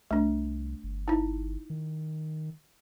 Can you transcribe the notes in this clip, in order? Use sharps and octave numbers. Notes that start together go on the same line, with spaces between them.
C2 A3 D4
G1
D#4 E4
D#3